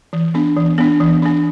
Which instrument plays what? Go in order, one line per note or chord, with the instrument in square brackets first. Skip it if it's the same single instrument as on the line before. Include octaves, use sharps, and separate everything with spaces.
[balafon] E3
B3 D4
E3
B3 D4
E3
B3 D4